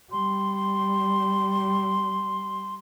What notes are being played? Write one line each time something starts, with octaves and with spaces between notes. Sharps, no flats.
G3 C6